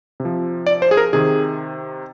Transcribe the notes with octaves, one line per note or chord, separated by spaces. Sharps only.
C3
F3
D5
C5
G#4
A#4
C3 D#3 G#4